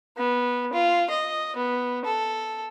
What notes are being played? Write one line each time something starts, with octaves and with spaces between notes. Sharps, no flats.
B3
F4
D#5
B3
A4